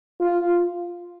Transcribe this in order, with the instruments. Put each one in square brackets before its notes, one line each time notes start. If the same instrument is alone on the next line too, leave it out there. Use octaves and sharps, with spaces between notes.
[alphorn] F4